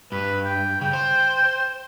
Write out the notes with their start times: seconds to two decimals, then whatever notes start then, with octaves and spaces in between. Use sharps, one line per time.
0.12 G2 B4
0.45 G5
0.81 C#3 G5
0.93 C5